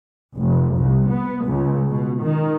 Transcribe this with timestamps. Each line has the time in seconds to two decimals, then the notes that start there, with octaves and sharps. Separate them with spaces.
0.38 F1
0.76 C2
1.10 B3
1.46 C#2
1.90 B2
2.21 D#3